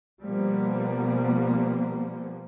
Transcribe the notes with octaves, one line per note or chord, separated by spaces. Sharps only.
B2 F3 G3 A#3 B3